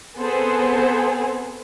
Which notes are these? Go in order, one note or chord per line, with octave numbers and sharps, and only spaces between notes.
B3 C4 G#4 A4 C5